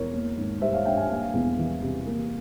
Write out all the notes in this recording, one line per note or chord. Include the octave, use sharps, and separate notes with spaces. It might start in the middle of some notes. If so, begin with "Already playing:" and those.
Already playing: E2 A#4 C#5
A#3
G#1
G3 C5 E5
C#5 F5
G2 E5 G5
F5 G#5
A#3 F5 G#5
E2
E3
C3
A#3